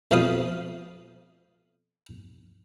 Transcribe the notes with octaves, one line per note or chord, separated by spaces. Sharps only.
F2 B2 F3 F5 B5 D#6